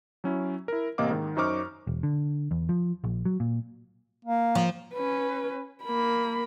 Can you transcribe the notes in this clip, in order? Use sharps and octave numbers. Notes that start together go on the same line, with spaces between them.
F#3 C#4 E4
E4 A#4
A1 C3 A#3 D#5 F5 D6
G#2 D#3
F#2 D#4 C5 C#6 D6 F6
E1
D3
E2
F3
A#1
F#3
A#2
A#3
F3
C#4 B4
A#3 B5